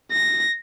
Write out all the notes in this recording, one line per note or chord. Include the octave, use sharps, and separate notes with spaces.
A#6